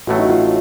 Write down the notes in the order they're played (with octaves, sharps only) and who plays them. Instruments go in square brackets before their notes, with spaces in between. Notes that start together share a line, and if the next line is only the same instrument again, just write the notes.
[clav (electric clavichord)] A1 A2 F#3 A3 [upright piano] F#4
[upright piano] D#4
F#4
F4